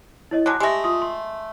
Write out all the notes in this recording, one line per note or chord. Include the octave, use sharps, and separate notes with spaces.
E4 C#5 D#5
F#3 G#3 A5 D6 F#6
G#3 A3 G4 G#5 A#6
F4 C6 D#6
C6